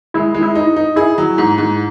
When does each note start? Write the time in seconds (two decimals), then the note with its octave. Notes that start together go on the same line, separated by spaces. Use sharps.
0.14 G#3 E4
0.34 G#3
0.42 E4
0.55 D#4
0.76 D#4
0.96 E4 G#4
1.18 F#3
1.38 G#2
1.58 G#2